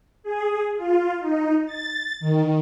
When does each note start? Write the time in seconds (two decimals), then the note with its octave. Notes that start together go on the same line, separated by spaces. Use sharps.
0.23 G#4
0.77 F4
1.20 D#4
1.65 A6
2.20 D#3